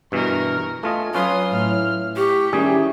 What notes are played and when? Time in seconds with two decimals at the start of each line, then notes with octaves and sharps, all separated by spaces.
0.12 G2 B2 E3 A#4 C#6
0.83 A3 F4 D#5 G#5
1.15 F#3 C#4 F4 B4 C6 D#6
1.51 A2 F6
2.16 G4 G5 C#6
2.53 D#3 G3 C#4 E4 G#4